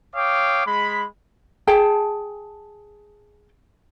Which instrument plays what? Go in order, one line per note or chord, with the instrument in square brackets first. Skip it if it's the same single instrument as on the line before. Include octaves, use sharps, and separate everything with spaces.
[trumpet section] C#5 F5 G5 D6 D#6
G#3 B5
[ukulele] G#4 G5 A5